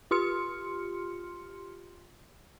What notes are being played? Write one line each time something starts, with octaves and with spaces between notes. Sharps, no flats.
F4 G4 C6 F6 C#7